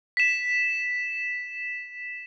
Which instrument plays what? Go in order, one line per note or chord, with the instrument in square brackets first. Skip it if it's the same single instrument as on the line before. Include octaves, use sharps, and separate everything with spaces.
[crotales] B6 E7